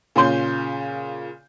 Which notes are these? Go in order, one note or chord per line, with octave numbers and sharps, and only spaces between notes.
A#2 C#3 C#4 C6 G6